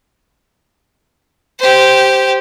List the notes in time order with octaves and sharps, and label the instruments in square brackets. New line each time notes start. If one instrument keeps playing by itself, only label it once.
[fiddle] G4 C5